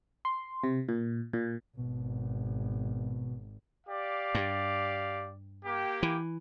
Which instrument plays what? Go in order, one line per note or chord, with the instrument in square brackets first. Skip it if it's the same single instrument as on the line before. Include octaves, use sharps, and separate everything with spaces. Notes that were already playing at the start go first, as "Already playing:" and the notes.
[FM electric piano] C6
C3
A#2
A#2
[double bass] G#1 [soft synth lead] B2
[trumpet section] G4 D5 F5
[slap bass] G2
[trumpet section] A#3 G4
[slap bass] E3